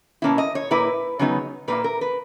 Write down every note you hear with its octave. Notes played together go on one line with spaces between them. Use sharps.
B2 A#3 C#4 E4
D#5
C#5
A#2 A#3 E4 B4
C#3 F#3 B3 D#4 C#5
A#2 A#3 E4 B4
A#4
B4